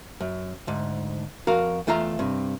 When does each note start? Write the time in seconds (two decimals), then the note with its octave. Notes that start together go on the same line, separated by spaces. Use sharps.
0.21 F#2
0.67 D2 G#2
1.47 F2 F#4 A#4 F5 A#5
1.87 E2 A3 F4 E5 A#5
2.19 G2 C3